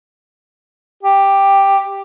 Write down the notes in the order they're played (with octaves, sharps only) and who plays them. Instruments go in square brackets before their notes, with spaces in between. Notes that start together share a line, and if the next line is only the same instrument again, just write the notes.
[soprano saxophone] G4